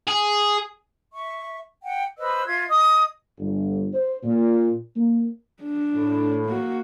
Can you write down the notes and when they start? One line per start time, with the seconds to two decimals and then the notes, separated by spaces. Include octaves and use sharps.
0.08 G#4
1.13 E5 C#6
1.82 F#5 G5
2.18 B4 C5 D#5 E6
2.46 F4 E5 G#6
2.68 D#5 D#6
3.38 G1
3.93 C5
4.24 A#2
4.96 A#3
5.63 D4
5.94 A2
6.46 A#3 F#4